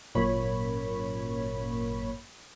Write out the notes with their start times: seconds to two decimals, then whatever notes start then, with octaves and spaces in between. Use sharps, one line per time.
0.15 G#1 F#2 A#2 A#3 C#5 B5